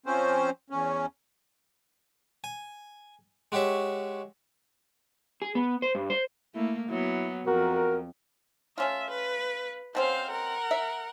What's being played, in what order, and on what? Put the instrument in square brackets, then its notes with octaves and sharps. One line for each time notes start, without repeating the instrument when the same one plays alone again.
[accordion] F3 C4 C#4 C5
E2 C#4
[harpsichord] G#5
G#3 F#4 G4 C#5 E5
[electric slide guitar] G#4
B3
C5
G2
C5
[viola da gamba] A3 A#3 [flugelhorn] E4
[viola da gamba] F#3 B3 [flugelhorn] E4
[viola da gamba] F2 [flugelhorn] F#4 [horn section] A#4
[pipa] A3 C#4 F4 [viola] E5
[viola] B4
[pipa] B2 C4 C#4 [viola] C5 F5
[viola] A#4 F#5
[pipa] E5